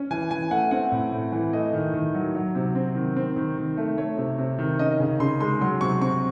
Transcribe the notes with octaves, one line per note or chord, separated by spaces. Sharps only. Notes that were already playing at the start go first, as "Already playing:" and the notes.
Already playing: C#4
E3 G#5
E3 G#5
A3 F#5
C4 F#5
A2
A2
E3
A3 D#5
D#3
D#3
F#3
F#3
C3
C4
D#3
C4
D#3
D#3
A3
A3 C#5
C3
C3
D#3
C#4 D#5
C#3
C#3 C6
G#3 C6
F#3 C6
C3 C#6
C4 C#6